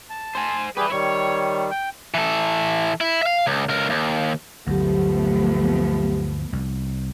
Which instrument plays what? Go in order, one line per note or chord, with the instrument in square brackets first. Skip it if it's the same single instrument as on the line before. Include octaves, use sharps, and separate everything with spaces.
[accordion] A5
[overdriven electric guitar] C5 G#5
[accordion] G3 G4 G#4 [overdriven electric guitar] E4 B4
[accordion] D#3 G3 [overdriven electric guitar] C#5
[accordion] G5
[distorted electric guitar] E3 A4
E4
E5 F5
C#2
C#2 A#4
D#2
[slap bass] G1 D2 [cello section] F3 A3 B3 [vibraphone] F#3 G4
[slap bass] C2